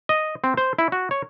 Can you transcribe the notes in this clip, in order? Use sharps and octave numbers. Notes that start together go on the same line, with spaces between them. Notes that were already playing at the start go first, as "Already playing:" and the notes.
D#5
C4
C5
E4
F#4
C#5